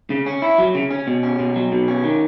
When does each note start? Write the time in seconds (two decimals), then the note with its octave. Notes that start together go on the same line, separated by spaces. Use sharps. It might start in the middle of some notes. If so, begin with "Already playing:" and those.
0.10 C#3
0.26 C#4
0.42 E4
0.58 F#3
0.75 C#3
0.91 C#4
1.07 B2
1.23 C#4
1.39 B2
1.56 F#3
1.72 B2
1.88 C#4
2.04 D#3